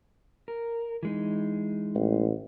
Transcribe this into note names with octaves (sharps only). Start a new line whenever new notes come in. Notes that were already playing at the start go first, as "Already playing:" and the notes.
A#4
E3 G#3 D#4
A1